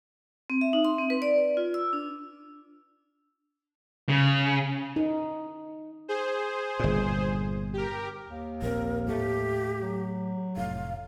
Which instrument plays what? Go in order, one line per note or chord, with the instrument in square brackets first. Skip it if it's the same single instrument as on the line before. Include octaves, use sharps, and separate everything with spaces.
[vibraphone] C4
E5
D#4
C6
C4
B4
D5
D5
F4
E6
D4
[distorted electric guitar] C#3
[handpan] D#4
[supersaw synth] G#4 C5
[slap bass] G1 A#2
[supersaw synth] G4 A#4
[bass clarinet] D#2
[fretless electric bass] A#1 C4 [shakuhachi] A#4
[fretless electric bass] A2 A3 [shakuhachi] G4
[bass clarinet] F#3
[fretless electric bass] F1 A2 [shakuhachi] F5